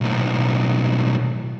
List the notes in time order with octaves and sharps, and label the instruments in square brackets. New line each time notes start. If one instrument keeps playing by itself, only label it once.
[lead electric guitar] B1 A2